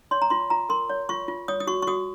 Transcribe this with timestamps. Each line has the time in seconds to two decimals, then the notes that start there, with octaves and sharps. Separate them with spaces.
0.11 C#5 C6
0.22 A#5
0.30 F4 C6
0.50 F4 A#5
0.69 A#4 C6
0.90 C#5
1.09 F4 C#6
1.28 F4
1.48 C#5 D#6
1.60 D#6
1.67 F#4 C#6
1.82 C#6
1.87 F#4 D#6